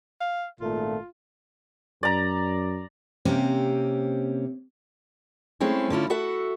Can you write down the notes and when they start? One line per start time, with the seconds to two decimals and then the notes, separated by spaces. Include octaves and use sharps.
0.21 F5
0.61 G#1 A#2 A3 F4
2.03 F#2 D5 A#5
3.25 C3 A#3 C4 C#4 G4
5.60 G#3 A3 C4 C#4 E4
5.90 D3 C#4 E4 F4
6.10 F#4 A4 E5 F#5